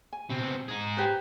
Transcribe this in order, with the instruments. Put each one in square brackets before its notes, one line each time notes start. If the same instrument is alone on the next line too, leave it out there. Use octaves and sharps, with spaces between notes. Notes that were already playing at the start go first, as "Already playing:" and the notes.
[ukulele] G#5
[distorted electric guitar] B2 C4
D#4 G#4
[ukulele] G4 B4 C5